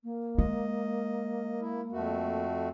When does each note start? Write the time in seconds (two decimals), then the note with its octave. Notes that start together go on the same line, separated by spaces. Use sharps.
0.03 A#3
0.38 G#3 D#5
1.61 E4
1.92 F2 A3 F#4